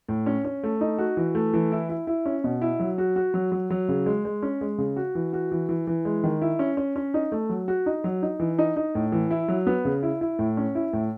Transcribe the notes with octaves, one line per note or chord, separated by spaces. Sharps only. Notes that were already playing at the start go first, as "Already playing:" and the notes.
A2
C#4
C#4
A3
D#4
F#4
E3
A3
E3
E4
E4
E4
C#4
B2
E4
F#3
F#4
F#4
F#3
F#3
F#3
C#3
G#3
G#3
C#4
G#3
C#3
F#4
E3
F#4
E3
E3
E3
G#3
D#3
E4
C#4
C#4
C#4
D#4
A3
F#3
F#4
D#4
F#3
D#4
E3
D#4
D#4
A2
E3
E4
F#3
B3
C#3
E4
E4
A2
C#4
E4
A2